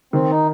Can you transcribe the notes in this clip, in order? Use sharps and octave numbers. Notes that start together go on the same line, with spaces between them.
D#3 C4
D#4